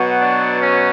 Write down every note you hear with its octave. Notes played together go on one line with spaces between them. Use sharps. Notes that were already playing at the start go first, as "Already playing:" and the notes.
Already playing: B2 F#3 B3
D4
C#4